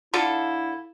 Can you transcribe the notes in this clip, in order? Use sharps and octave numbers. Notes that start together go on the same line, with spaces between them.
D3 E4 F4 A4